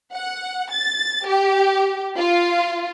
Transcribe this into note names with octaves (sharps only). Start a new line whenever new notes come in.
F#5
A6
G4
F4